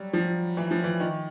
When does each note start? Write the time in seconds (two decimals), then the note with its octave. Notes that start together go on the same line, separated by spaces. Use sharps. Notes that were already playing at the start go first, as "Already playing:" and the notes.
Already playing: F#3 G3
0.13 F3
0.57 E3
0.71 F3
0.84 E3
1.00 D#3